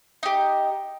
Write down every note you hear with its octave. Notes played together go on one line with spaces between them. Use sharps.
D#4 G4